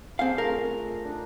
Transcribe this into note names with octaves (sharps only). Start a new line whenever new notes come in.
C4 G#4 A4 D5 F5
A3 D4 F4 A#4
D4 D#4